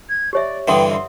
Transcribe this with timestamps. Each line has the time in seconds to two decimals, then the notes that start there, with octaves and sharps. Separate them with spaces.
0.09 G#6
0.33 G4 C#5 D5 E5
0.68 G2 D3 E3 F#5 G5 C6 D#6
0.91 E5 C6